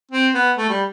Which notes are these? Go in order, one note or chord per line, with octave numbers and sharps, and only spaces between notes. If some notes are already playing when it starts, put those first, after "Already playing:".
C4
B3
A3
G3